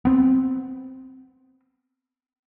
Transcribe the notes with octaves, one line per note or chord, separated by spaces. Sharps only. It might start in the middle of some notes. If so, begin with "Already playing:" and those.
B3 C4